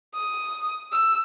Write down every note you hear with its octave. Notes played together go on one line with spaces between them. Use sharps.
D#6
E6